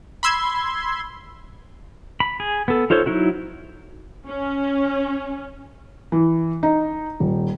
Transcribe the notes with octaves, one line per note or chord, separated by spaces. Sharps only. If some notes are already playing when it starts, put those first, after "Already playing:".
B5 C6 E6 G#6
B5
G#4
B3 A4
D#4 F4 A4 C5 C#5
F#3 D#4 E4 F#4
C#4
E3
D#4
D#1